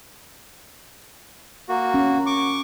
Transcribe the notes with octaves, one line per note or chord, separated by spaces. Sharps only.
A#3 F#4
C#4
C#6 D6